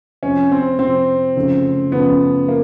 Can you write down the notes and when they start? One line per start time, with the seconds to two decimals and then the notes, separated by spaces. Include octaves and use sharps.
0.23 F2 C3 F3 C#4
0.52 C4
0.79 F2 C3 F3 C4
1.36 F#2 C#3 F3 A3
1.92 F#2 C#3 F3 A3 B3
2.48 A#3